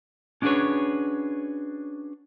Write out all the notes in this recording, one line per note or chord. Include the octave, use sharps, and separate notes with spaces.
C#4 D4 F#4 G#4 B4 C#5